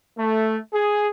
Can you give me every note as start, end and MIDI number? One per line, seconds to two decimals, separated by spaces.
0.17 0.58 57
0.73 1.08 68